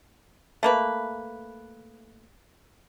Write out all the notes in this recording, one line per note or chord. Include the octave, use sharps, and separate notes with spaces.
A3 A#3 B4